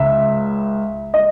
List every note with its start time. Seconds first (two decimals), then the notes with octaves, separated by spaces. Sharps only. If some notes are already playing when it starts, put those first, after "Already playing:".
Already playing: C#2 C#3 E5
1.14 D#5